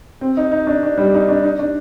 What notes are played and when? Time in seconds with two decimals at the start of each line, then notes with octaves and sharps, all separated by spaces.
0.21 C4
0.37 D#4
0.52 D#4
0.67 D4
0.83 D4
0.98 G3
1.14 D#4
1.29 D4
1.43 D#4
1.59 D4